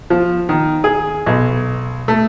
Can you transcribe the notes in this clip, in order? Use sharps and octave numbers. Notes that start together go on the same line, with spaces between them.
F3
D#3
G#4
B1
A3